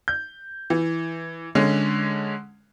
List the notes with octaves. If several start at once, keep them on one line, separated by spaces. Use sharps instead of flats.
G6
E3
D3 G#3 C#4